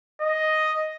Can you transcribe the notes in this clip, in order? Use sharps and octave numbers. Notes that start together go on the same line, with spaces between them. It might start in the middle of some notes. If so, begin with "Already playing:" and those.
D#5